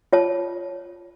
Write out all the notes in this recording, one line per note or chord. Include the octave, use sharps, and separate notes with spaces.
F4 C#5 A5